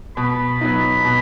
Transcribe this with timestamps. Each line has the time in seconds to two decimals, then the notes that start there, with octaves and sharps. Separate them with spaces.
0.17 B2 B5
0.61 F#3 B3 D#4
1.05 B2